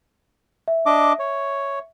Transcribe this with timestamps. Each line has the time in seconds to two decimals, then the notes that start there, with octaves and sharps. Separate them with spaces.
0.68 E5
0.86 D4 D#5 D6
1.19 C#5